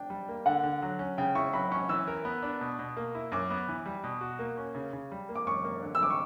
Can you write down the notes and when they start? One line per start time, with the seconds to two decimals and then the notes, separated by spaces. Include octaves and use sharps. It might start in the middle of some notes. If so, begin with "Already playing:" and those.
Already playing: D4 G5
0.10 G3
0.29 A#3
0.46 D3 F#5
0.63 D3
0.82 F#3
0.99 C#4
1.18 C#3 G5
1.35 E4 C#6
1.53 F#3 B5
1.72 C#4 C#6
1.89 E3 E6
2.08 A#4
2.25 B3
2.43 D4
2.61 B2
2.79 B2
2.97 A#3
3.15 E4
3.32 F#2 D6
3.50 B3
3.68 E3
3.86 G3
4.04 B2
4.21 F#4
4.39 A#3
4.57 C#4
4.75 C#3
4.93 C#3
5.12 G3
5.29 A#3
5.35 D6
5.47 F#2 C#6
5.64 A#3
5.82 D3
5.95 E6
6.00 G3 D6
6.10 C#6